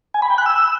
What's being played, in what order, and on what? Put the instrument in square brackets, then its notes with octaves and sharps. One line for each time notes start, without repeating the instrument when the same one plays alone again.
[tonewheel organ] G#5
B5
G5
F#6
E6